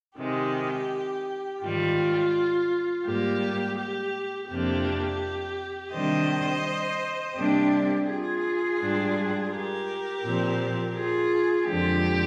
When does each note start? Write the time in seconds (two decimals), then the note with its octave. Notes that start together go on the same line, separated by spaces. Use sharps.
0.18 C3 D#3 G#3 G4
1.62 G#2 D#3 G3 F4
3.05 G#2 G3 A#3 G4
3.78 G4
4.49 F2 C3 F3 A#3 D4 G4
5.92 C3 D#3 G3 D4 C5 D#5
7.36 C3 G3 A#3 D4 G4
8.08 F4 G#4
8.80 G#2 G3 D4
9.51 G4 A#4
10.23 A#2 F3 C4
10.96 F4 G#4
11.66 F2 D3 F3 G#3 G4